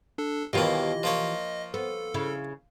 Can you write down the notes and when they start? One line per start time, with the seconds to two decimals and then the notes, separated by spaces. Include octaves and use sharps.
0.18 D4 A4
0.53 D#2 B2 E3 A#3 F4 G4 D#5
1.03 F3 A#3 C#5
1.74 B3 A4
2.14 C#3 E4